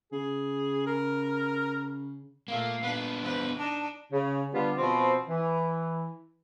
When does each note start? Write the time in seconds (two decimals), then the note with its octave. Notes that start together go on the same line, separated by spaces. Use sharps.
0.12 C#3 G#4
0.87 A#4
2.48 A#2 A3 A#3 F5
2.83 B3 D4 B4
3.21 E2 B4 C5
3.57 D4 D#4 A5
4.12 C#3
4.54 D3 G3 B3 F4
4.78 B2 F3 C4
5.29 E3